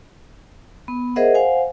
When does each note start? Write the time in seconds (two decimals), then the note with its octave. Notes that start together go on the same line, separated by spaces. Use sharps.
0.88 B3
1.16 G#4 A#4 C5 D#5 E5 F#5
1.35 C5 F5 F#5 G#5